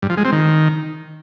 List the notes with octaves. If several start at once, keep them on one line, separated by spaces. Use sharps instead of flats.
G2
F3
G#3
C4
D#3